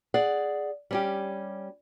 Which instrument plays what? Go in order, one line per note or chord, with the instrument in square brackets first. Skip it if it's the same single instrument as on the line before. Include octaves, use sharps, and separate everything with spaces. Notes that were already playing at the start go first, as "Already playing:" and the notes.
[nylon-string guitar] G#4 D5 F#5
G3 C#4 G4